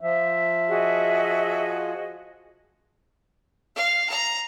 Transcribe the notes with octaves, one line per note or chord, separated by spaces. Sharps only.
F3 E5
F#4 G#4 D#5
F5
A#5